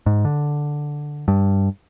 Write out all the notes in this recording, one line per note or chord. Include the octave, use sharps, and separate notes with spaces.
G#2
D3
G2